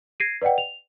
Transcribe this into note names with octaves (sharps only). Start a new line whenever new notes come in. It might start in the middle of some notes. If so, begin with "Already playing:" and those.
G#6 A#6 C7 D7 D#7
B4 D5 D#5 F#5 G5
F7